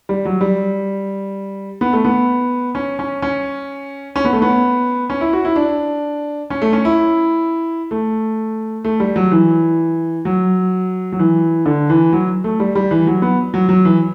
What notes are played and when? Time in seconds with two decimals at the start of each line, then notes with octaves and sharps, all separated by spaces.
0.09 G3
0.25 F#3
0.41 G3
1.81 B3
1.93 A3
2.05 B3
2.75 C#4
2.99 C#4
3.22 C#4
4.16 C#4
4.25 B3
4.33 A3
4.42 B3
5.10 C#4
5.21 E4
5.33 F#4
5.45 E4
5.56 D4
6.50 C#4
6.62 A3
6.73 C#4
6.85 E4
7.91 A3
8.85 A3
9.00 G3
9.16 F#3
9.32 E3
10.25 F#3
11.12 F#3
11.19 E3
11.66 D3
11.90 E3
12.13 F#3
12.44 A3
12.60 G3
12.75 G3
12.91 E3
13.07 F#3
13.22 B3
13.54 F#3
13.69 F#3
13.85 E3